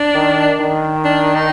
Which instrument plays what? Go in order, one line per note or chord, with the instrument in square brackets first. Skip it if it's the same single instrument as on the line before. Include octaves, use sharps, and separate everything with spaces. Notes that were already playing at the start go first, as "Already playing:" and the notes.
Already playing: [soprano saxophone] D4
[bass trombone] D#3
D#3
[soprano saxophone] D4
D#4